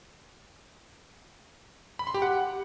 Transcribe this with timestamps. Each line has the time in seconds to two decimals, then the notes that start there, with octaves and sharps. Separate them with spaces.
1.99 B5
2.07 C6
2.14 G4
2.22 F#5